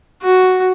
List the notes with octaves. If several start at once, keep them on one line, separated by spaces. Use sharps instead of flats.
F#4